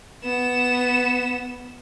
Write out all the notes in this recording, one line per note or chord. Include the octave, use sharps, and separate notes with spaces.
B3 E7